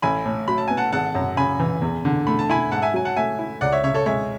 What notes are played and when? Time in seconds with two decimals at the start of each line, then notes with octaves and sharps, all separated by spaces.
0.02 A1 G#5 B5
0.25 A2
0.48 F#3 B5
0.58 A5
0.68 B3 G#5
0.77 F#5 A5
0.92 G#1 F#5 A5
1.15 F#2
1.37 C#3 G#5 B5
1.60 E3
1.82 E2
2.05 D3
2.27 A3 B5
2.39 A5
2.49 E4 G#5 B5
2.72 G#2 F#5 A5
2.82 E5 G#5
2.94 F#3 G#5
3.05 F#5 A5
3.16 A3 E5 G#5
3.39 E4
3.61 C#2 D5 F#5
3.72 C#5 E5
3.83 C#3 C#5 E5
3.94 A4 C#5
4.06 G#3 C#5 E5